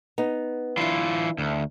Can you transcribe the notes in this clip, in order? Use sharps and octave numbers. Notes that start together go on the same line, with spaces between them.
B3 D#4
E3 D4 E4 F4
D2